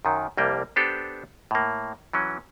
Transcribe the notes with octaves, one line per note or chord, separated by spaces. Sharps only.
F#2 D#3 F#3
C2 F2 G3 A#3 G5
B3 D4 G4 A4 C5
A2 A#3
E3 F#3 C#4